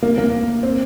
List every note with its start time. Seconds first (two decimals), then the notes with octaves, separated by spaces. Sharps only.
0.03 A#3
0.18 A#3
0.63 C4